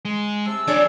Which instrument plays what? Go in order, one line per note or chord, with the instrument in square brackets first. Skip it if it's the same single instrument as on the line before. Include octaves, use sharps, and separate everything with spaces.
[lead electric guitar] G#3
[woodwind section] C3 A5 E6
[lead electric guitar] F3 G#4 [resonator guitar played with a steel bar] D4 C#5 D5